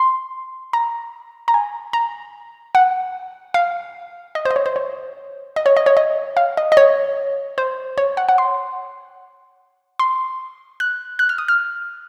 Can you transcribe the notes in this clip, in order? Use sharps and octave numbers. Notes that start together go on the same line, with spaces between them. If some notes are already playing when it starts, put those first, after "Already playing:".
Already playing: C6
A#5
A#5
G#5
A#5
F#5
F5
D#5
C5
D#5
C#5
C5
C#5
D#5
C#5
D#5
C#5
D#5
F5
D#5
D#5
C#5
C5
C#5
F#5
F#5
C6
C6
F#6
F#6
F6
D#6
F6